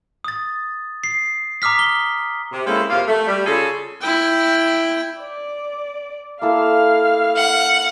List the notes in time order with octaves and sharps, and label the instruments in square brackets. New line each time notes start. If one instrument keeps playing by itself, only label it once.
[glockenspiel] D#6 A6
C7
A#5 D6 D#6 F6 B6
G7
[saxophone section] C3
G#3 A#3 C4 C#4 E4 A4
F2 C3 A#3 F4
A3
G3
C#3 F4 G#4 A4
[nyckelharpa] E4 G5
[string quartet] D5
[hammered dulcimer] A#3 E4 A4 [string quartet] F5 F6
[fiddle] F#5